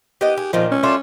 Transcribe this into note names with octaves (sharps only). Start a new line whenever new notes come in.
B3 G4 D#5
G#4
A#2 D#3 F3
C#4
A3 D4 F4